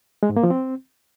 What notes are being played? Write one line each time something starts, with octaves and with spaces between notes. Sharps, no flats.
G#3
G#2
A#3
F3
C4